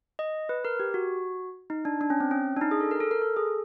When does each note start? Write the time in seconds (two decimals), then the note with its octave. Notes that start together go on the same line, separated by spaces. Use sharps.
0.19 D#5
0.49 B4
0.65 A#4
0.80 G4
0.94 F#4
1.70 D#4
1.85 D4
2.01 D4
2.10 C#4
2.20 C4
2.31 C#4
2.57 D4
2.61 D#4
2.71 G#4
2.80 A4
2.91 A#4
3.00 A4
3.11 A#4
3.22 A4
3.36 G#4